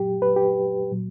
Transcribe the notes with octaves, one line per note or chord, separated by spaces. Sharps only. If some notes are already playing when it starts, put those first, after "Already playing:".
Already playing: A#2 F#3 G4
B4
G4
A#2 F#3